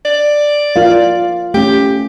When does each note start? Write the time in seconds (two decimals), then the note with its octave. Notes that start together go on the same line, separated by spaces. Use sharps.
0.05 D5
0.76 F4 A#4 F5
1.54 A3 C#4 G4